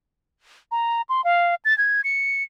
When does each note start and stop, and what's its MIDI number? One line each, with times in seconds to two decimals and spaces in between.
0.72 1.02 82
1.09 1.24 84
1.24 1.55 77
1.65 1.76 93
1.78 2.01 92
2.04 2.43 97